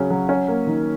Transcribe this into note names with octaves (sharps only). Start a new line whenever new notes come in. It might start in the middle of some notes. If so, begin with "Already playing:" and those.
Already playing: C#3 F#3 C#4 F#4
F#3
C#4
A#3
D#3